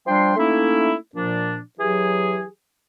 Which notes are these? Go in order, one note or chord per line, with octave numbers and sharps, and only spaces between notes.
F3 G3 D4 G5 C6
A3 A#3 C#4 D#4 E4
A#2 F3 D4
E3 F#3 G4 G#4